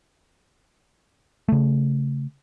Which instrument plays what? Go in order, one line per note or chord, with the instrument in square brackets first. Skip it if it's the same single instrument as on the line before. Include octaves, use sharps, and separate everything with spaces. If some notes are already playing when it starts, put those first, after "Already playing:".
[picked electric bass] C#3 A3